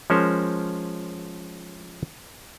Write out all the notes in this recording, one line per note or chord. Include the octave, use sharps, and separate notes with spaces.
F3 G#3 C#4 A#4 C5